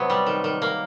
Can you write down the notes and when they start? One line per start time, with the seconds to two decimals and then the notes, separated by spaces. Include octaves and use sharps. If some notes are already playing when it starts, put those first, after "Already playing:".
Already playing: C3 F#3 B3
0.10 G3
0.27 D#3
0.44 D#3
0.62 A#3